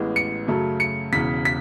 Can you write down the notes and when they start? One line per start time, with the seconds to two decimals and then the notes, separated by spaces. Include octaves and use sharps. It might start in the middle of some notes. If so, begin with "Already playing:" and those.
Already playing: A1 A2 G#3 B3
0.16 C#7
0.47 F#2 C#3 F#3 A3
0.80 C#7
1.13 E1 E2 C#3 B6
1.45 B6